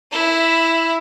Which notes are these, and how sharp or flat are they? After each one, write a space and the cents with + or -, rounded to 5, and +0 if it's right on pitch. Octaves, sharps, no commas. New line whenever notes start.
E4 +0 E5 +15